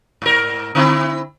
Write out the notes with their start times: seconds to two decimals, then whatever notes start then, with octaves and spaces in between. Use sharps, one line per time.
0.22 G#2 A#4
0.75 D3 C4 E4